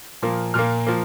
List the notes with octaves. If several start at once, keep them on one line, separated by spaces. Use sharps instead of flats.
A#2 F3 A#3
A#2 A#3 F6
F3 A#3